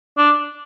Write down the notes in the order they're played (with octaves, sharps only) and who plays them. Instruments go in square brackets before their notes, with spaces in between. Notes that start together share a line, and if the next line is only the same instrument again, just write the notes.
[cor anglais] D4